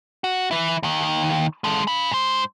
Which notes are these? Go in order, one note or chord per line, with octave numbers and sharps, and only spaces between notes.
F#4
E3 E4
D#2 D#3
G#3 A4
F5 B5
G#2 C5